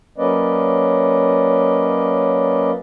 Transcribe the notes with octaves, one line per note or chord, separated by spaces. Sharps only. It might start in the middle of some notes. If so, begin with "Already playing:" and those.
F#3 A#3 C#4 B4 D5 D#5